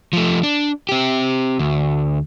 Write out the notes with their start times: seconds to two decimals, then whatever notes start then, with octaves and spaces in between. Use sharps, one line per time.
0.13 F3 A3
0.43 D4
0.89 C4 G4
1.59 D2